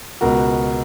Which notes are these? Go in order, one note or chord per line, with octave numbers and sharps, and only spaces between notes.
C#2 B2 F#4 A#4